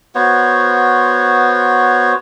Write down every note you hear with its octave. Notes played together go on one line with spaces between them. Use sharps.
B3 F#4 C5 C#5